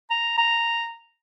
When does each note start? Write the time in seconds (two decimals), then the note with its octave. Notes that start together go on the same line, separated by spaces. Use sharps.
0.11 A#5
0.38 A#5